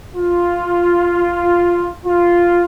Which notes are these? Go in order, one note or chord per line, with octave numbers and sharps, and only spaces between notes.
F4
F4